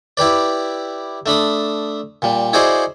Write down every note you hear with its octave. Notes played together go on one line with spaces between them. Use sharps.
E4 G4 B4 D5
A3 D4 B5 D#6
A#2 G3
E4 F#4 G#4 C5 D5 D#5